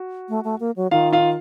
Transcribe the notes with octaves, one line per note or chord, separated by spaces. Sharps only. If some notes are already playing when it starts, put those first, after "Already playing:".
Already playing: F#4
A3
A3
A#3
F#3
D#3 F4 F5
F4 F5